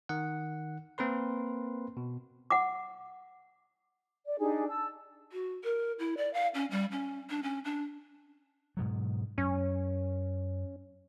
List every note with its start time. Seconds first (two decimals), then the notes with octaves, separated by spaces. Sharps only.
0.09 D#3 F#5
0.98 A#3 C4 A#4 B4 C6
1.97 B2
2.50 F#5 D6
4.26 D5
4.39 D4 D#4 G4 G#4
4.68 A5 E6
5.33 F#4
5.64 A#4
5.99 E4
6.17 D5
6.34 F5
6.55 C#4
6.71 G3
6.92 C#4
7.30 D4
7.43 C#4
7.65 D4
8.77 G#2 B2 F#3
9.38 F#2 C#4